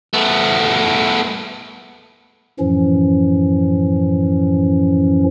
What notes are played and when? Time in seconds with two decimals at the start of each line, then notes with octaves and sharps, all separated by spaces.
0.14 A3 B3
2.59 F#2 A2 E3 F3 C#4